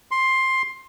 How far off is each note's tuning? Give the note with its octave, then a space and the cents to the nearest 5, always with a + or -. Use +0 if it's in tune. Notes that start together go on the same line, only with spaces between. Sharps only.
C6 +10